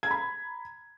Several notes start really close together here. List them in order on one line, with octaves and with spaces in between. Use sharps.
G#6 A#5 B5